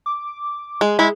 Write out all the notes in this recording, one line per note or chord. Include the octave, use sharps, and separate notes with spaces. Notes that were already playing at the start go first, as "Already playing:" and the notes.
D6
G#3 G#4
G#3 E4